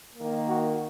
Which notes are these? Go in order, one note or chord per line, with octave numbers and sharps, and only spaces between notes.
D#3 A#3
F#4